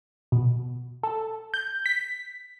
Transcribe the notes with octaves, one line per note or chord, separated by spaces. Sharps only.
B2
A4
G6
B6